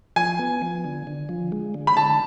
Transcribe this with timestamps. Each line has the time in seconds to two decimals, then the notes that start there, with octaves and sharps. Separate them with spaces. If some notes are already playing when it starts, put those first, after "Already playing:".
0.16 F3 G#5
0.39 B3
0.62 F3
0.84 D3
1.07 D3
1.29 F3
1.52 G#3
1.74 D3
1.87 B5
1.97 D3 A5